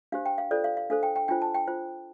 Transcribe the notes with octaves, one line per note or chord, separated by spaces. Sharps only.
D4 G4 C5 F5
G5
F5
F4 A4 C5 D5
F5
F5
D4 A4 C5 F5
G5
G5
D4 F4 C5 G5
A5
G5
F4 C5